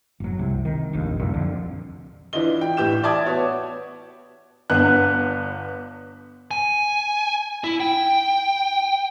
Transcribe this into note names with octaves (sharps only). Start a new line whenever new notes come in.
F#1 F#3
C2 C3
D#3
F1 A#1 D#2
C2 F#2 A#2
F2 D3
E3 D4 E4 F4 D#5 G7
G5
A2 E3 G4 G6 E7
D5 E5 A5 D6 D#6 G#6
B3 F#4 C#5
G1 B3 D4 F#6
G#5
E4
G5